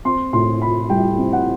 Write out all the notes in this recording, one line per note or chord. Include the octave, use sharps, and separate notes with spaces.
C4 C6
A2 C6
E4 B5
G3 G5
C4
F#5